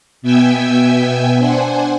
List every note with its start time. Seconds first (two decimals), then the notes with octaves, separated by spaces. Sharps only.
0.22 B2 B3 E5 G5 G#5 E6
1.38 D4 C5 F#5 G#5